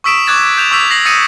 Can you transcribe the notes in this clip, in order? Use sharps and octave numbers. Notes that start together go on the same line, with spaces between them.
C#6 D#6 E6 B6 D7 E7
C#6 D6 F#6 G#6 A6 E7
G6 E7 F7
C#6 D6 E6 G6 B6 F7
A#6 C7 F#7
D#6 A6 A#6 C#7 D#7